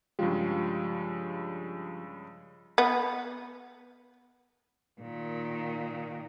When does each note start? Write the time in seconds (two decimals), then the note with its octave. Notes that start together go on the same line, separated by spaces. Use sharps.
0.19 G2 C#3 F3 G#3 F4 G4
2.78 B3
5.00 A#2 D#3